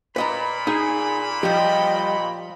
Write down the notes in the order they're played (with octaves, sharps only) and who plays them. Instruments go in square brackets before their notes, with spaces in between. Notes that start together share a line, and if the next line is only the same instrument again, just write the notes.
[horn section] A#2 B5 [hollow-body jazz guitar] B4 D#5 A#5
[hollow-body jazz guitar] D#4 [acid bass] G#4
[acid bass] F3 [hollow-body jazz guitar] G3 G4 [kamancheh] D#5 G5